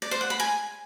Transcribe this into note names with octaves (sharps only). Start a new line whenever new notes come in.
D5
C5
F#5
B5
G#5